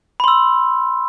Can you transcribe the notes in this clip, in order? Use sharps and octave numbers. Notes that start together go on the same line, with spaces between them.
B5 C6 E6